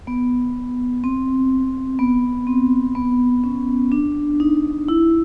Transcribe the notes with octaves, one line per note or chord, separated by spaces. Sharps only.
B3
C4
B3
C4
B3
C#4
D4
D#4
E4